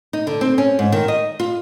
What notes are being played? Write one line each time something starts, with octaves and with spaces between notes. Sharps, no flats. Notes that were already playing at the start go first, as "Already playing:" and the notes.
D#4
D3
C4
C#4
G#2
D#3
D#5
F4